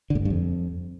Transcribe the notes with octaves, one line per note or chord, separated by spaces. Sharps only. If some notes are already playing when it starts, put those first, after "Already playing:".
D3
A2
G#2
G2
F2